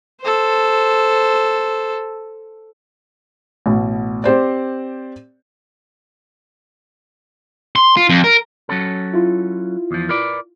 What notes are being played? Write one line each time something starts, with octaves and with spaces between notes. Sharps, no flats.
A4 C5
A1 B2
C4 G4 C5 D5
C6
F4
F2
A#4
F#3 C#4 A4
E4 F4
E2 F3
A#4 B4 D5